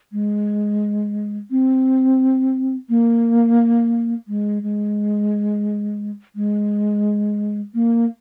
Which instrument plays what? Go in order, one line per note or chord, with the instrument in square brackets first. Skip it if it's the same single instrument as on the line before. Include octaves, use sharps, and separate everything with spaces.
[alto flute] G#3
C4
A#3
G#3
G#3
G#3
A#3